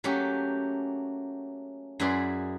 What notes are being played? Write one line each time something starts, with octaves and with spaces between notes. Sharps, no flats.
F#3 A3 A#3 C#4 G4
F#2 E4 G#4 B4 D5 C6